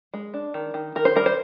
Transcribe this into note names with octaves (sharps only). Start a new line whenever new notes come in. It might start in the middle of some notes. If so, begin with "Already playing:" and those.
G#3
D4
D#3
D#3
D#3 A#4
C5
G3 A#4
C5